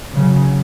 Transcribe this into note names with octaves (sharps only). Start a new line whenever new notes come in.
C#3 F#3